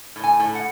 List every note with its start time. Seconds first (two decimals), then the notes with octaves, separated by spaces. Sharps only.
0.16 A2
0.24 G#5
0.40 A2
0.55 F#5